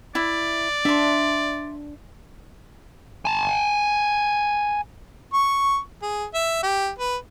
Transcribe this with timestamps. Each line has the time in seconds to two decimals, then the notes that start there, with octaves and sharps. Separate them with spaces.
0.15 E4 D5
0.85 D4 E5 C6
3.25 G#5 A5
5.33 C#6
6.02 G#4
6.34 E5
6.63 G4
6.98 B4